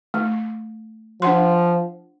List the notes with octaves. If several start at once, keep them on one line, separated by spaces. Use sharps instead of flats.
A3
F3 D4 F#5 C6